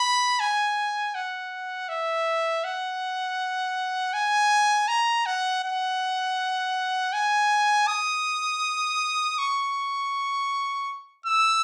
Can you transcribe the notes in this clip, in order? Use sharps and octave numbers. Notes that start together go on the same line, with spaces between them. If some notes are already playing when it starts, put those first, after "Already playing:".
Already playing: B5
G#5
F#5
E5
F#5
G#5
A#5
F#5
F#5
G#5
D#6
C#6
E6